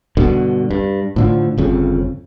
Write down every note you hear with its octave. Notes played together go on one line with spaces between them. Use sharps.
G2 B2 D3
G2
A2 D3 F3
G1 F2 C#3